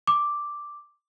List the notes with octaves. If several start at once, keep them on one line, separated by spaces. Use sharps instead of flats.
D6